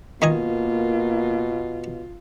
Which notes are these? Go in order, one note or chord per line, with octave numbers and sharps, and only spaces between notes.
B2 D#3 A#3 F4 D#5 G#5